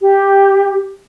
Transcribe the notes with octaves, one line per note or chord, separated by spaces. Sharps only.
G4